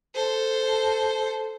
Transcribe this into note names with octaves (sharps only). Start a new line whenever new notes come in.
A4 C5